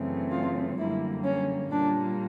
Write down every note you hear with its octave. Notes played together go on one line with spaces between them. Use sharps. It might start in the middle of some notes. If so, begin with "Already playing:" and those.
Already playing: F#2 C#3 E3 A3 C4
F4
F#2 D3 G3 A#3 E4
C#4
A#2 G3 A#3 D4